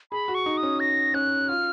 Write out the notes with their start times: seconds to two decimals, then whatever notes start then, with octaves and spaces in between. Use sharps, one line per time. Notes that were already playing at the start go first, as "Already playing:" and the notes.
0.11 G#4 B5
0.28 F#4
0.35 C#6
0.46 D#4
0.57 D#6
0.63 C#4
0.80 A#6
1.14 C#4 F#6
1.48 F4 F6